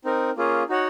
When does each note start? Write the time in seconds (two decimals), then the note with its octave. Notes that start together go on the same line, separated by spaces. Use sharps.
0.05 C4 D#4 A#4
0.37 A#3 C#4 F4 G#4
0.69 D#4 F#4 C#5 F#5